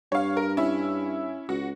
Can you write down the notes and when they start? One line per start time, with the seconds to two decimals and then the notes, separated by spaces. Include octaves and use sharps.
0.12 G2 C#5 F5
0.37 A#4
0.57 C#4 E4
1.49 C#2 F#4